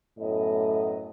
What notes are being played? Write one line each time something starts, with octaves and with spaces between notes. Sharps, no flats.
F#2 A2 B3 D#5